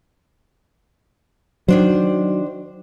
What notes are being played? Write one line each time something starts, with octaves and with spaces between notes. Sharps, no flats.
D#3 F#3 D4 C5